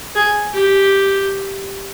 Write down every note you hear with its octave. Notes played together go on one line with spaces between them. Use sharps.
G#4
G4